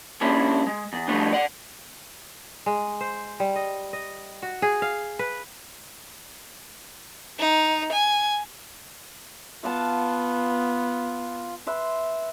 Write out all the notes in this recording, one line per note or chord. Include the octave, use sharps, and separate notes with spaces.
G#3 A#3 C#4 D4 E4 G4
G#3
E2
F3 G3 A3 B3 D4
D5 F#5
G#3
C5
G3
D#5
D#5
F#4
G#4
F5
B4
D#4
G#5
B3 F4 F5 F#5 A5
B4 E5 C6